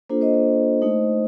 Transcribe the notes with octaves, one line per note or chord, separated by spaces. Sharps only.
A#3 D4 F4 A4 C5
C5 D#5
C5 D#5
A3 D#4